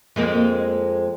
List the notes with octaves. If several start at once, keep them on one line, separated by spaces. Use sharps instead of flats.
F2 G#3 A#3